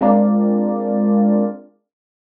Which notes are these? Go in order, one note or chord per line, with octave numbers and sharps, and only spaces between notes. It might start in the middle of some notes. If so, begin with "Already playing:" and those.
G#3 C4 D4 F4 A#4 D5